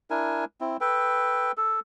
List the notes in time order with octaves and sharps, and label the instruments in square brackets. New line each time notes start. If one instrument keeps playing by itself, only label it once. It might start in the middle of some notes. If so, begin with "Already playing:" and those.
[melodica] D4 E4 A#4 G#5
C4 E4
A4 B4 G5
A4